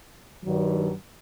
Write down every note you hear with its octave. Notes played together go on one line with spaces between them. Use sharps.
G2 D#3 F#3